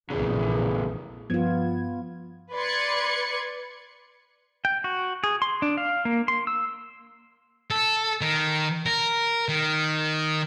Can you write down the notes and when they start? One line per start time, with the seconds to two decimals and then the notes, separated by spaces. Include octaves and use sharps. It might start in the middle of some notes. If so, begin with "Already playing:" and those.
0.10 F1 A#1 A2 C#3 E3 G#4
1.30 G2 F3 B3 F4 G#6
2.53 B4 D5 C6 G#6 C#7
4.65 G5
4.84 F#4
5.24 G#4
5.42 C6
5.62 D4
5.77 F5
6.05 A#3
6.28 C6
6.47 E6
7.70 A4
8.21 D#3
8.86 A#4
9.49 D#3